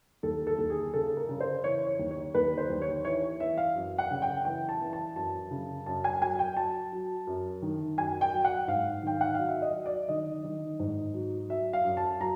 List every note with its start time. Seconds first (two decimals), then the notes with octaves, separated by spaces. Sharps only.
0.23 D#2 A4
0.47 A4
0.58 D#2
0.70 G#4
0.94 C#3 A4
1.17 A#4
1.29 C#3
1.40 C5
1.64 E3 C#5
1.87 C#5
1.99 D#2
2.11 C#5
2.34 D#2 B4
2.58 C5
2.70 D#2
2.82 C#5
3.05 E3 C#5
3.40 E3 E5
3.57 F5
3.75 F#2
3.98 F#5
4.11 C#3
4.22 G5
4.45 E3 G5
4.69 A5
4.81 E3
4.93 A5
5.16 F#2 A5
5.51 C#3
5.86 F#2 A5
6.04 G#5
6.22 F#3 G#5
6.39 G5
6.57 F#3 A5
6.92 F#3
7.27 F#2
7.62 D#3
7.98 F#2 G#5
8.21 G5
8.33 F#3
8.44 F#5
8.68 G#2 F5
9.03 D#3 G5
9.21 F#5
9.34 F#3 F5
9.48 E5
9.62 D#5
9.74 F#3
9.86 D5
10.09 D#3 D#5
10.44 D#3
10.80 G#2
11.14 F#3
11.50 F#3 E5
11.73 F5
11.85 F#2
11.97 A5
12.20 F#3 A#5